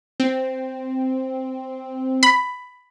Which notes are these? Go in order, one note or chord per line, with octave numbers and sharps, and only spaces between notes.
C4
B5